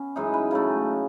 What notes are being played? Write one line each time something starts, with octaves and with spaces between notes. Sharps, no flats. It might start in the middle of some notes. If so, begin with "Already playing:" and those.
Already playing: B3 C#4
F#2 E3 G#3 D#4
B4
C#3 F#3 A3